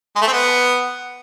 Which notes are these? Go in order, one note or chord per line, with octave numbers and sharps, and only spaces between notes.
G#3
A3
C4
B3